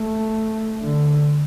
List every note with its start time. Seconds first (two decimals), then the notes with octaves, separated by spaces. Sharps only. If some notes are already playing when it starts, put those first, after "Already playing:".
Already playing: A3
0.82 D3